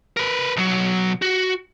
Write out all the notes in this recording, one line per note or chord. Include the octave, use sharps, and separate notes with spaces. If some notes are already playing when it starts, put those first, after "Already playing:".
A#4 B4
B1 F#3
F#4